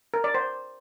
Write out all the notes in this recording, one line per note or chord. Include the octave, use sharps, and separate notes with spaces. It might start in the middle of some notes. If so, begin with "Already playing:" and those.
A#4
D5
C5